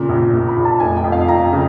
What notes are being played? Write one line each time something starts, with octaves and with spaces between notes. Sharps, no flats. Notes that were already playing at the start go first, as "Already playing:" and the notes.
Already playing: A#2 C#3
A#1
A#1
B5
A#1
A5
F1 G#5
G5
F2
F5
F2 A#5
C#3